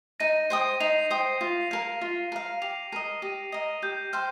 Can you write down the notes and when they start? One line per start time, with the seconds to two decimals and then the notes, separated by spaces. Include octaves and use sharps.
0.20 D#4 A#6 D#7
0.50 C5 G5 D#6
0.80 D#4 C7 F7
1.10 C5 G5 D#6
1.41 F4
1.71 A#4 F5
2.01 F4
2.32 A#4 F5
2.62 G4 C7 F7
2.92 A#4 D#5 A#6 D#7
3.22 G4 A#6 D#7
3.52 A#4 D#5 A#6
3.82 G4 G6
4.13 C5 G5 C6 F6